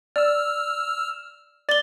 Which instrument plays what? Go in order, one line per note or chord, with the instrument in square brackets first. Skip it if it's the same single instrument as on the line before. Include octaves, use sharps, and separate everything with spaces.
[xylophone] D5 [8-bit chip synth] E6 F6
[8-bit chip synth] D5 [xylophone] A6 G7